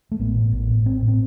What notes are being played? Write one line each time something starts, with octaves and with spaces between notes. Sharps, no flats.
A3
A1 B3
A2
A1
A2
A1 C4
A2
C4